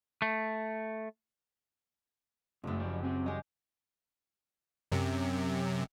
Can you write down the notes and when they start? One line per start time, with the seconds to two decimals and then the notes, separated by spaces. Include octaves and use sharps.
0.22 A3
2.64 F#1 F#2 A#2 A3
2.79 F3 G4
3.03 C4 G4
3.26 G3 G4 D#5 G#5
4.92 F#2 C3